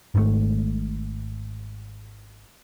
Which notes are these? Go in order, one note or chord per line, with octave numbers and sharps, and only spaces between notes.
G#1 G#2 B2 A3